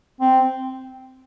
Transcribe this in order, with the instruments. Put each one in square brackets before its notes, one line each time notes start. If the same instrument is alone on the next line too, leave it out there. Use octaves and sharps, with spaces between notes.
[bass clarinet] C4